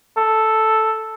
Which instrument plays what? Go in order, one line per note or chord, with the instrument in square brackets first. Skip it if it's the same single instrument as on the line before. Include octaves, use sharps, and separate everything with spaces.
[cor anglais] A4